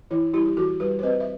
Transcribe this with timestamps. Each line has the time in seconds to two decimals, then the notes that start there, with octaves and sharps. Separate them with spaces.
0.11 E3 E4
0.34 G3 E4 G4
0.46 G4
0.57 E3 F#4 A4
0.80 G3 G4 B4
0.99 C5
1.03 C4 B4 D#5
1.20 E5